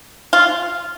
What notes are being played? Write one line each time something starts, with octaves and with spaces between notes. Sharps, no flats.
F4